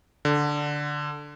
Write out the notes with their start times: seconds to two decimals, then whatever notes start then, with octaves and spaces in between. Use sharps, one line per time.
0.25 D3